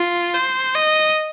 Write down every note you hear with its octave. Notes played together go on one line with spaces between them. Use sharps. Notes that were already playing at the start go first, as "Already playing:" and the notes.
Already playing: F4
C5
D#5